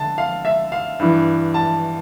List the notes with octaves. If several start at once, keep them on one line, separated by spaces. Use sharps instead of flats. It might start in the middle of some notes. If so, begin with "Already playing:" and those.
Already playing: D3 A5
F5
E5
F5
G2 E3
A5